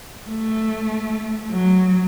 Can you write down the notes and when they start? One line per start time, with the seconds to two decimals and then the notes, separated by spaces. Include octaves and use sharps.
0.27 A3
1.51 F#3